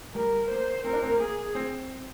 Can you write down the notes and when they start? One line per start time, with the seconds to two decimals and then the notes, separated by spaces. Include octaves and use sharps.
0.15 G3 A#4
0.50 A#3 C5
0.84 C4 A#4
0.93 D4
1.03 C4
1.11 A#3
1.20 G#4
1.55 C4